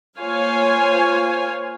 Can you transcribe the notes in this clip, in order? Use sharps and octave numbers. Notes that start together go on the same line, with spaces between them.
A#3 F4 C5 C#5 F5 G#5